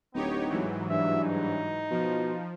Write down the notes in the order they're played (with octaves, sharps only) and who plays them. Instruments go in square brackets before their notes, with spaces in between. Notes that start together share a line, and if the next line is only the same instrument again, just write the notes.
[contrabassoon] D1 [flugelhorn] B3 [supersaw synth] D#4 G4 C#5
[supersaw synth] G#2 E3 F#3
[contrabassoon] G2 [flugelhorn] E5
[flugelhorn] D#4
[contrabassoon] B2 [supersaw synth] F3